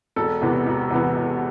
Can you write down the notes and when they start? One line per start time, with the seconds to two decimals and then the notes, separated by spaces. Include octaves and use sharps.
0.16 E1 A4
0.41 E2 C3 E3 B3
0.67 E1
0.90 E2 C3 E3 B3
1.16 E1